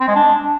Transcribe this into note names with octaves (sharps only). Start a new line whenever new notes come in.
C4
G#3
D4